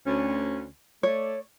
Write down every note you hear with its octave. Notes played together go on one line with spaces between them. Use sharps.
D2 C#4
A3 C#5 D5